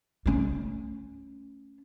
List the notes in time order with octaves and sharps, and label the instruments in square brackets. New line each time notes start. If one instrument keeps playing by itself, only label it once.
[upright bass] A3 C#4